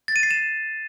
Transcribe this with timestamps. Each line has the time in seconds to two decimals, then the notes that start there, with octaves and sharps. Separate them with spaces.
0.08 A6
0.16 D#7
0.23 C7
0.31 E7